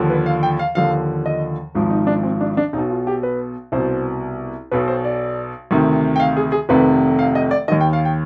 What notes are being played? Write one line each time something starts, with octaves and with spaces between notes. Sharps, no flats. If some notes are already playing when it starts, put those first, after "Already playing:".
Already playing: D#2 D3 F3
B4
F5
G5
F5
D#2 D3 F3 F5
D#5
G#1 G#2 F3
D#4
D4
C4
D4
D4
B1 B2 D#4
F4
G4
B4
C2 B2 C5
B1 B2 B4
C5
D5
D2 C3 D#3
G5
F5
G#4
G#4
F1 F2 C3 D#3 B4
F5
D#5
D5
D#2 D#3 D#5
G5
F5
G5